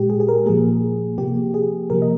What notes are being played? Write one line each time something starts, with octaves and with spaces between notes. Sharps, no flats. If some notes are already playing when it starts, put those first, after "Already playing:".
Already playing: A#2 G#3 G4
G#4
G#4
A#4
A#2 F3 A#3 G#4
C3 F3 A#3 G4
G#4
C3 F3 A#3 A#4
D#5